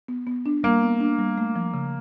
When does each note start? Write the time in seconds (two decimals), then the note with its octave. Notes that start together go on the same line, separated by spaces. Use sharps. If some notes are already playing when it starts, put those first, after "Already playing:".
0.08 B3
0.27 B3
0.46 D4
0.63 G3 A#3
0.83 B3
1.00 D4
1.19 G3
1.38 A3
1.56 F3
1.74 C#3